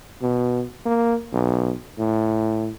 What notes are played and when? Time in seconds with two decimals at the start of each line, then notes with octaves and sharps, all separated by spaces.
0.22 B2
0.86 A#3
1.32 B1
1.99 A2